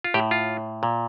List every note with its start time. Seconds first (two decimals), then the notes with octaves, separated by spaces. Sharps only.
0.04 F4
0.14 A2 G4
0.31 F4
0.83 A#2